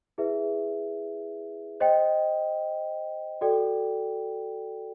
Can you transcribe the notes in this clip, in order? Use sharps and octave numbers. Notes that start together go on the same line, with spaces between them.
E4 G#4 B4 E5
C5 D#5 G5
F#4 A4 D5 G5